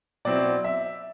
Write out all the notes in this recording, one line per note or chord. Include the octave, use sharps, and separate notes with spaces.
B2 F#3 C4 E4 D5
E5